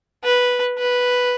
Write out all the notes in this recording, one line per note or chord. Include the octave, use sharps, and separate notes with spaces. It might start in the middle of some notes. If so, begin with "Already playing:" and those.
B4
B4